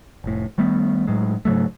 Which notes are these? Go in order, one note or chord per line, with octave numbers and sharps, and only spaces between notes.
F1 A2
D#3 G3 A3 B3
A2 F#3 G#3
G#2 C#3 F#3 A3